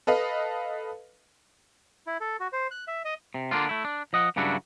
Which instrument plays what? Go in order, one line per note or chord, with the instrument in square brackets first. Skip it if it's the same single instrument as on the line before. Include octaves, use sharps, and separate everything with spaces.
[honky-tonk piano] A4 B4 D#5 F5
[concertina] E4
A4
F#4
C5
F#6
E5
D#5
[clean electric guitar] C3
D3 A#3 D4 F4
A3 E4
D4
F3 D#5 F#5
G2 C#3 F#3 D4 E4 F#4